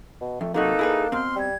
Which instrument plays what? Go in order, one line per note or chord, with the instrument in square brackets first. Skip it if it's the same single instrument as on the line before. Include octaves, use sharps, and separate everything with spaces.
[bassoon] B2
[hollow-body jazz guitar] F2 [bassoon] A3
[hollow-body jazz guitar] C3 F#3 F#4 [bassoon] A#3 [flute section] D#4 A4 F#6
[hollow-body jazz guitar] E4 G#4 B4
[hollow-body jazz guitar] B2 C4 [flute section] C6 F6
[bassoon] G3 [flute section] G#6